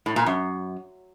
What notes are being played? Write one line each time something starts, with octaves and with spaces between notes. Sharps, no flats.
A2
A#2
F#2